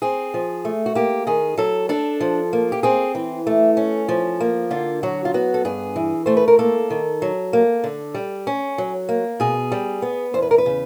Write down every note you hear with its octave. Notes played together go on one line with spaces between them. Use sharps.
C4 G#4
F3
A3
F#4
A#3 G4
D#3 G#4
F#3 A4
D4 A4
F3
A#3
G4
C4 G#4
E3
A3
C#4
F3
A#3
D3 F4
F#3 F#4
F4
B3 F#4
A4
G2 G#4
E3
A3 C5
B4
A#4
A#3 A4
D#3
F#3
A#3
D3
G3
C#4
F#3
A#3
B2 G#4
G3
B3
E2 C5
B4
A#4
B4
C#3